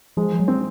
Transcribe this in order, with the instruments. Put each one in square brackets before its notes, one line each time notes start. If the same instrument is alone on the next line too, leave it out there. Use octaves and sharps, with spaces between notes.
[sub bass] F3 [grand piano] G#3
[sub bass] F#3
[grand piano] C4